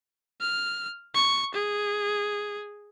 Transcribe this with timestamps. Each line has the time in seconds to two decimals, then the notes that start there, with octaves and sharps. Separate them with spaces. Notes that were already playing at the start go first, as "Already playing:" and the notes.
0.41 F6
1.15 C#6
1.54 G#4